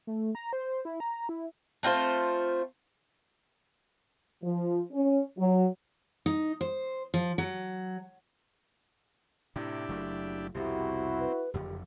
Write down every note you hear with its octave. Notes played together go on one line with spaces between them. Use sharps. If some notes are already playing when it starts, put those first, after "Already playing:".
A3
A#5
C5
E4
A#5
E4
A3 C4 F4 C5
F3
C#4
F#3
D#4
C5
F3
F#3
A2 C3 D4 E4 G4
F#1 F#3 A3
C2 F2 B2 C4 E4 F#4 G4
B4
F#1 F2 D3 G4